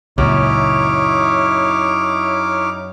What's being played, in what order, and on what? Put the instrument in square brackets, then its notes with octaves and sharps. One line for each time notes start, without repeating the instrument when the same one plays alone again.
[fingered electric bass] C#2 A#2 [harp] F#2 [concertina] D#4 D6 F6 [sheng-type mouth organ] E4 C#5